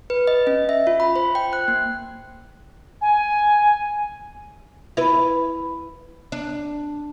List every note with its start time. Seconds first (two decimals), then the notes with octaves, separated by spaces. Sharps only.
0.10 B4
0.27 D#5
0.47 C#4
0.69 E5
0.87 F4
1.00 B5
1.16 C5
1.35 G5
1.53 F#6
1.68 A#3
3.01 G#5
4.97 E4 B4
6.32 D4